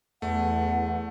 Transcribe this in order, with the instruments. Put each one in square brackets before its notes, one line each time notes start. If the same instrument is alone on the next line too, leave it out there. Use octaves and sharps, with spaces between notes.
[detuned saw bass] E2 [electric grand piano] A3 [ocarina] F#5